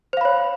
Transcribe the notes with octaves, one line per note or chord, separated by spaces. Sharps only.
C5 C#5 F5 B5